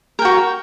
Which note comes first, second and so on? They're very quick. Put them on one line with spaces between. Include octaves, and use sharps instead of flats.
A#4 G5 F#4